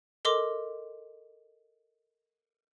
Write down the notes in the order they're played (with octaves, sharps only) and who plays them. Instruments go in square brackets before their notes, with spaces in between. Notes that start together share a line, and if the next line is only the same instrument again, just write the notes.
[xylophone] A4 A#4 D#5 C6 D6